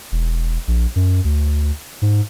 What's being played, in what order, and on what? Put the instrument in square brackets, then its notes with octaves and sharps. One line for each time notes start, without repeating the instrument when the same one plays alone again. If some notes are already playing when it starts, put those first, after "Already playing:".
[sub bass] E1
A#1
F#2
D2
G#2